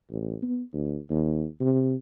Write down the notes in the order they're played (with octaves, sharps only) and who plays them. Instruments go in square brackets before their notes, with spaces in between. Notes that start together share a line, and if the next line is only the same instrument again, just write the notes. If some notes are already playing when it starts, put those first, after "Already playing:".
[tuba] A1
B3
D2
D#2
C3